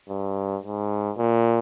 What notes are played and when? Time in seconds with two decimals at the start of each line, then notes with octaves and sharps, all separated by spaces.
0.09 G2
0.63 G#2
1.17 A#2